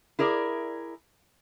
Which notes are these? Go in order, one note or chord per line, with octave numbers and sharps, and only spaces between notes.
E4 G#4 A#4 D5